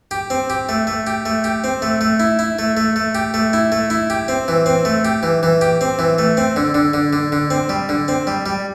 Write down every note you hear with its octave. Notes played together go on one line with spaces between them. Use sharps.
G4
C4
G4
A3
A3
G4
A3
G4
C4
A3
A3
E4
E4
A3
A3
A3
G4
A3
E4
A3
E4
G4
C4
E3
C4
A3
G4
E3
E3
G4
C4
E3
A3
C4
D3
D3
D3
D3
D3
C4
G3
D3
C4
G3
G3